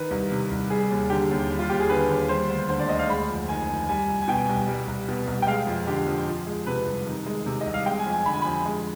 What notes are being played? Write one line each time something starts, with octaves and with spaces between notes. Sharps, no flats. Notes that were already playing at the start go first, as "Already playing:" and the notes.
Already playing: D#3 B4
C2
C3
C2
G3 G#4
D#2
D3 G4
D#2
G3
F4
D#2 G4
G#4
D3 B4
D#2
G3 C5
D2
D3 C5
D5
D2 D#5
F5
G#3 B5
F2
D#3 G#5
F2
G3 G#5
C2
G#5
B2 G5
C2
G3
C2
B2
C2
G5
G#3 F5
F2
D3 G4
F2
F3
G#3
C3 B4
C2
D#3
G#3
C3
D#5
C2
F5
G#3 G5
G#5
F2
G#5
D3 B5
G#5
F2 B5
G#3